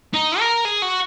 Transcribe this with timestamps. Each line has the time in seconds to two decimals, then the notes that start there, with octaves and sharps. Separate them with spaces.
0.14 D#4
0.40 A#4
0.65 G#4
0.82 F#4